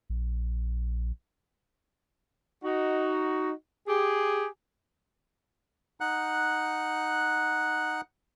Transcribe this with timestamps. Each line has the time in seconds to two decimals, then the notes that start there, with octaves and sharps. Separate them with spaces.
0.10 A#1
2.63 D#4 F#4
3.88 G4 G#4
6.01 D#4 F#5 F#6